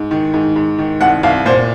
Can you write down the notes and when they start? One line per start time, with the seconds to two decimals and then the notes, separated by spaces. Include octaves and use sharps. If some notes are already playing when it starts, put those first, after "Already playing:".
Already playing: G#2
0.11 D#3
0.34 G#2
0.56 G#2
0.79 D#3
1.01 C2 F#5
1.23 C2 F5
1.46 A#2 C5